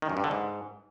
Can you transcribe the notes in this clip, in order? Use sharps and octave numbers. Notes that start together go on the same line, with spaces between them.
D#3
F#2
G2
D3
G#2